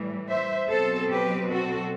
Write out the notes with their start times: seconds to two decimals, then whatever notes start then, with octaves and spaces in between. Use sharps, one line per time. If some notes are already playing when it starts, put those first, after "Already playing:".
Already playing: A2 E3 G3
0.28 C5 E5
0.69 B2 F#3 C4 A4 C5
1.10 G4 B4
1.50 F#4 A4